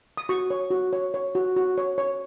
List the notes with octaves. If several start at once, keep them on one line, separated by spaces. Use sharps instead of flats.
D#6
F#4 C#6
C#5
F#4
C#5
C#5
F#4
F#4
C#5
C#5